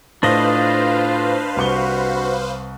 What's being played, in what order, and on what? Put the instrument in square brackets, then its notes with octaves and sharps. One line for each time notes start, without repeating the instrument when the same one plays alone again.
[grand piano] A2 [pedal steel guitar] D4 D#5 [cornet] F4 [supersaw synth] B4 C5 F5
[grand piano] C2 C#6 G7 [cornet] F#4